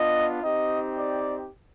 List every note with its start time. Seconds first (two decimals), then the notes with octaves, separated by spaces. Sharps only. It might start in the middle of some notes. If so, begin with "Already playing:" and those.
Already playing: B3 D4 F4 D#5
0.42 C4 D#4 G4 D#5
0.96 D5